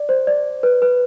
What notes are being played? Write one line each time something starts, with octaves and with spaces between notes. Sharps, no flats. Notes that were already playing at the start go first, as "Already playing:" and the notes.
Already playing: D5
C5
D5
B4
B4